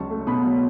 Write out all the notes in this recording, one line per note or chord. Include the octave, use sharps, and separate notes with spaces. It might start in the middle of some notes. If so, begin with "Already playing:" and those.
Already playing: C#2 F#3 A5 C#6
A3
B2 B5 D#6
F#3